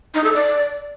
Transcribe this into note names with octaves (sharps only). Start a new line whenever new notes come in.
D#4
A4
D5